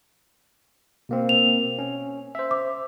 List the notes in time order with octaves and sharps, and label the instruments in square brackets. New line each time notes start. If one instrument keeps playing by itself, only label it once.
[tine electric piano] B2 A#3 C4
[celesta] F7
[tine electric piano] C#4
C5 E5
[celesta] D6